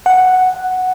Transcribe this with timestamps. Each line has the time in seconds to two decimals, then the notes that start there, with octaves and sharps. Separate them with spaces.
0.06 F#5